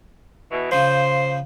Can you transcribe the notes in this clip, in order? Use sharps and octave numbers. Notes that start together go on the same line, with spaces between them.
B2 E3
C#3 F3 C5